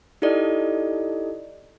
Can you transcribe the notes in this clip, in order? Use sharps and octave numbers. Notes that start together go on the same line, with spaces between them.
D#4 E4 G4 A4 D5 D#5